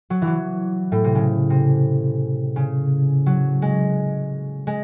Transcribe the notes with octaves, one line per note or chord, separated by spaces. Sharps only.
F#3
E3
F#3
A2
C3
C#3
C3
C#3
F#3
G#3
G#3